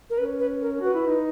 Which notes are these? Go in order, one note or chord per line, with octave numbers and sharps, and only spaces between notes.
A#4
C#4 B4
B4
A#4
F#4 B4
E4
D#4